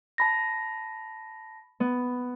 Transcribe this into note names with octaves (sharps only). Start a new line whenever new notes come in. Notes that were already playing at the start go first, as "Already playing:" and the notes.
A5 B5 A#6
B3